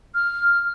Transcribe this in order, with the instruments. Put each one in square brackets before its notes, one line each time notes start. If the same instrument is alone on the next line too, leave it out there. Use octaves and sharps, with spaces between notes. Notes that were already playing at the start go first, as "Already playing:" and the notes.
[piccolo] F6